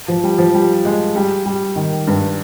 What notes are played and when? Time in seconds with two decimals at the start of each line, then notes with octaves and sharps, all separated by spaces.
0.08 F3
0.23 G3
0.38 F3
0.54 G3
0.85 G#3
1.16 G3
1.46 G3
1.76 D#3
2.07 G2